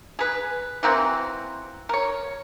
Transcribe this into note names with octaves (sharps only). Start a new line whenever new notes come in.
G#4 B4
E3 A#3 C4 F#4
A#4 C#5